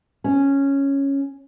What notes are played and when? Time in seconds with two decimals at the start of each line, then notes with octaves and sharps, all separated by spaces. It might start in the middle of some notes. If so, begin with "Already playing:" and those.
0.24 C#4